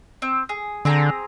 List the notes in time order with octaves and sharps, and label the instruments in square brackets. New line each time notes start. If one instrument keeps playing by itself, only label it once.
[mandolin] C4
G#4
[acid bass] D3 [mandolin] C4 G#4 A#5